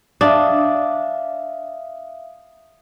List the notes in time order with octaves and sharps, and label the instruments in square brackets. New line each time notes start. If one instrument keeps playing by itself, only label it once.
[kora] D4 [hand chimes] E5 F5 D#6